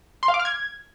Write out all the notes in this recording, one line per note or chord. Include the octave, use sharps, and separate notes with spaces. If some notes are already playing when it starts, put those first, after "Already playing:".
C6
F5
D6
F6
G#6